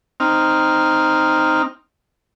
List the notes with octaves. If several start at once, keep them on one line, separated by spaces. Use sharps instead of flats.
C4 D#4 F6